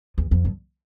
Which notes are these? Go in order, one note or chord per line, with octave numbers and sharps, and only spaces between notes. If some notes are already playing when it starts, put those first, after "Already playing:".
E2
F2
G2